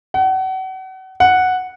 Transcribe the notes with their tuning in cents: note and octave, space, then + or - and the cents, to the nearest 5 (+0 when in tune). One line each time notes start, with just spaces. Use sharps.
F#5 +35
F#5 -5